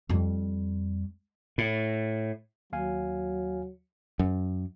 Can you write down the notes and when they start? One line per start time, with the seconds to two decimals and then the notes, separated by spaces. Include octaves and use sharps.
0.09 F2 G3
1.58 A2
2.72 D#2 F#3 F5 G#5
4.19 F#2